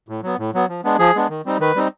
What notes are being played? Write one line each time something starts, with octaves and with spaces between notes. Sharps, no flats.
A2
F#3 B3
A2
F#3 B3
F3
G#3 B3 D4
F3 G#4
G#3 B3 D4
D#3
G3 C4 D#4
D#3 B4
G3 C4 D#4